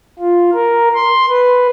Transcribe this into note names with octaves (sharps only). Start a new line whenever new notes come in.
F4
A#4
C6
B4